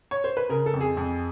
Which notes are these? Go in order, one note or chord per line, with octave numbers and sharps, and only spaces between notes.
C#5
C5
B4
C#3 A#4
A4
F2
G#4
F2